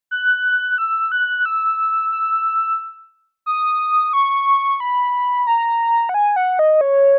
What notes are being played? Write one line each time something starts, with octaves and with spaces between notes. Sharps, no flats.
F#6
E6
F#6
E6
E6
D#6
C#6
B5
A#5
F#5
G#5
F#5
D#5
C#5